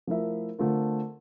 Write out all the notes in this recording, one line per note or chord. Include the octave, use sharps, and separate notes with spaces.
F3 A3 E4 A#4 E5
D3 A3 C4 F4 A#4